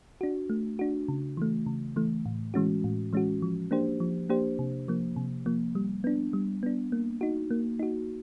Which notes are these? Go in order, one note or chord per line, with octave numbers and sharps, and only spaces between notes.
D4 F#4
A3
D4 F#4
C#3
E3 A3
C#3
E3 A3
A2
E3 G#3 C#4 F#4
A2
E3 G#3 C#4 F#4
F3
A#3 D4 G4 C5
F3
A#3 D4 G4 C5
C3
F3 A#3
C3
F3 A#3
G3
B3 D4
G3
B3 D4
A#3
D#4 F#4
A#3
D#4 F#4